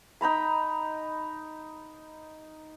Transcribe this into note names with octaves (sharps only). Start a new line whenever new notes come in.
D#4 G5 A#5 B5